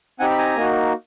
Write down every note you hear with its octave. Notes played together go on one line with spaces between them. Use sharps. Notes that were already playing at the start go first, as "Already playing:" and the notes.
C4 D#4 G4 F#5 G#5
B5
G#5 A#5
A#3 D#4 F#4